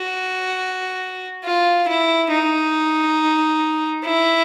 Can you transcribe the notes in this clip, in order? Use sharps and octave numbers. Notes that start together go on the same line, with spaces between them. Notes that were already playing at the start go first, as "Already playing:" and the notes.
Already playing: F#4
F4
E4
D#4
E4